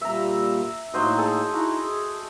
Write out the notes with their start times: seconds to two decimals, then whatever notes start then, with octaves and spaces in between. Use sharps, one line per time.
0.01 A#2 G3 A#3 E5 A#5
0.94 A2 F#3 A#3 D#4 C5 D#5
1.18 G#4 A4
1.54 D#4 E4 F#4 A#5
1.84 G#4